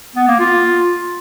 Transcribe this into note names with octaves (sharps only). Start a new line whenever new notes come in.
B3
A#3
F4